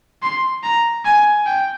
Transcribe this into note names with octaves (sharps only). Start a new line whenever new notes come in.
C6
A#5
G#5
G5